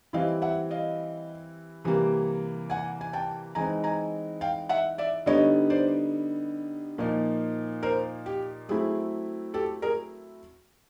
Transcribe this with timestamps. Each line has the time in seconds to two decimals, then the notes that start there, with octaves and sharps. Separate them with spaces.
0.13 E3 G3 C4 E4 D#5 F5
0.42 E5 F#5
0.71 D#5 F5
1.84 C3 E3 G3 A#3
2.70 F#5 G#5
3.01 G#5
3.13 G5 A5
3.55 E3 G#3 C4 D#4 G#5 A#5
3.84 G#5 A#5
4.41 F5 G5
4.69 E5 F#5
4.98 D5 E5
5.26 D3 G3 B3 D#4 C#5 D#5
5.70 C5 D5
6.98 A#2 F3 A#3 D#4
7.83 A#4 C5
8.26 G4
8.69 F#3 A3 C4 E4 G#4
9.54 G4 A4
9.82 G#4 A#4